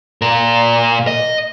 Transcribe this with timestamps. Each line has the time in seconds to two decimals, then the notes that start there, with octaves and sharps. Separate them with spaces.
0.22 A#2 A#4
1.07 D#5